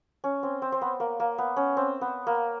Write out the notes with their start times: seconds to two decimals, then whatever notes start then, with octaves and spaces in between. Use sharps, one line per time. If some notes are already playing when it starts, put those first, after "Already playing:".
0.24 C#4
0.43 C4
0.62 C4
0.72 C4
0.81 B3
1.00 A#3
1.20 A#3
1.38 B3
1.57 C#4
1.77 C4
2.01 B3
2.27 A#3